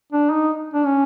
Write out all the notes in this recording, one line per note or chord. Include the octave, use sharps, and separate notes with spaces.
D4
D#4
D4
C#4